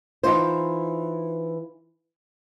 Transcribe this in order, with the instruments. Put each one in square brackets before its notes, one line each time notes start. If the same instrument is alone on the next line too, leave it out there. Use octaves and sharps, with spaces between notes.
[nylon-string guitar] E3 D#4 F4 C5